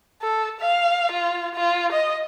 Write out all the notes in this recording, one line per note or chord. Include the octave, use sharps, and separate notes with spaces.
A4
F5
F4
F4
D#5